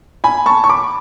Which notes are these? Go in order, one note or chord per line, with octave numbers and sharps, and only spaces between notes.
G#5 B5
A5 C#6
C#6
B5 D6